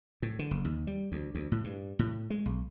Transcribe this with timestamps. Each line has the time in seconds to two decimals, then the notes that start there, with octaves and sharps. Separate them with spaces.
0.22 A2
0.39 D3
0.51 F#1
0.65 D#2
0.87 G3
1.12 D2
1.35 D2
1.52 A2
1.64 G2
1.99 A2
2.30 G#3
2.46 B1